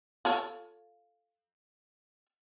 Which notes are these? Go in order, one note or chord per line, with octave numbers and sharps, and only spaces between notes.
F4 A4 C#5